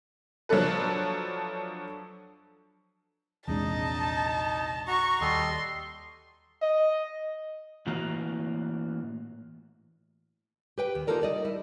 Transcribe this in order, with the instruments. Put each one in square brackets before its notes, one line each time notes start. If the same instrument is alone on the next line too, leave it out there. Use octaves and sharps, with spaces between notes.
[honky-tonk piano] F3 F#3 A3 D4 A4 B4
[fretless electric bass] A#1 E2 [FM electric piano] C3 G#3 D4 [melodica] D#4 D#5 [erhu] A5
[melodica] F#4 A#5 [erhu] C#6
[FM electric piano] D#2 [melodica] G3 A4 D#5 [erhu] C6
[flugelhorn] D#5
[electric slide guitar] A2 E3 A#3 F#4 A#5
[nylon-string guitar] G4 B4 G5
D#2
A#3 D#4 F4 A4 A#4 D5
G3 D5 D#5
G3 E4